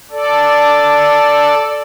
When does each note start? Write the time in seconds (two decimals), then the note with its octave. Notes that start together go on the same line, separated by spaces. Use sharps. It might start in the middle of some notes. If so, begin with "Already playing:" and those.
0.11 A4 D5